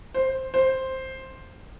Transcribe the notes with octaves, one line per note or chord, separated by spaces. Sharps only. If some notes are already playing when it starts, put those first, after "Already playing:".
C5
C5